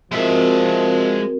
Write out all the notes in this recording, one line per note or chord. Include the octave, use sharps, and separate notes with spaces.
F3 G#3 C4 F#4 A#4 E5